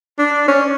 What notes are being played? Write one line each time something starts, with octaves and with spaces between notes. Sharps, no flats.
D4
C#4